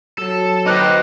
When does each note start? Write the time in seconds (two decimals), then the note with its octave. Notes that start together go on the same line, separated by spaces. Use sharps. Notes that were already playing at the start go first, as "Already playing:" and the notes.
0.18 F#3 A4
0.66 D#4 G4 B4 C5 D#5 D6 F#6